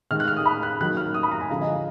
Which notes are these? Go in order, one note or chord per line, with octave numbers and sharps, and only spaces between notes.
D#3 G#3 F6
F#6
F6
D#6
B5
F#6
D#3 F#3 A#3 F#6
F6
D#6
B5
A#5
G#5
D3 F3 G#3 F5
D#5
F5